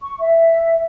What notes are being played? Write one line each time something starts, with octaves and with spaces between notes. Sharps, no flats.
C#6
E5